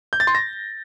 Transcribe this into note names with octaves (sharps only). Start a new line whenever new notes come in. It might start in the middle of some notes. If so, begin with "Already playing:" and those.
G6
A6
C6
A#6